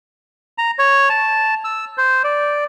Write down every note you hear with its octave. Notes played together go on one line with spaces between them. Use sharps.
A#5
C#5
A5
E6
C5
D5